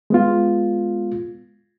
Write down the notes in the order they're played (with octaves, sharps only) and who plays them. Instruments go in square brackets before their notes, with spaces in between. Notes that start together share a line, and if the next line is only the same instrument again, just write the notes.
[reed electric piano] G#3 B3 F4